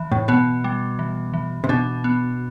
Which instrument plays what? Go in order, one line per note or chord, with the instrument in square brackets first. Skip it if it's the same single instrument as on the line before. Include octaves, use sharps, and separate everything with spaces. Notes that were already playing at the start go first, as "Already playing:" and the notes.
Already playing: [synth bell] E3
[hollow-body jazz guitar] A2
[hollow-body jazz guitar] B2 [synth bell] B3
[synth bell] G3
E3
E3
[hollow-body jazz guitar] C3
[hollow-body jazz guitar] B2 [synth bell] D4
[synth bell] B3